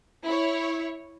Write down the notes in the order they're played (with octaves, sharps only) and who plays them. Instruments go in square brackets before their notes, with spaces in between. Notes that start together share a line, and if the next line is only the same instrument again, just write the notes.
[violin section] E4 C#5